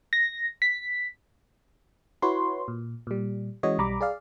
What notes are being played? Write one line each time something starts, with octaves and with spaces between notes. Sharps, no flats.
A#6
B6
E4 F#4 B4 C#5 C6
A#2
A#2 G3
E3 G#3 C#4 F#4 C#5 D#5
B1 G3 A#5 B5 D6
G#4 D5 F5